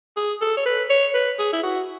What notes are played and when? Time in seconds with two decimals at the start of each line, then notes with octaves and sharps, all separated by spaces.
0.16 G#4
0.41 A4
0.57 C#5
0.65 B4
0.89 C#5
1.14 B4
1.39 G#4
1.53 E4
1.63 F#4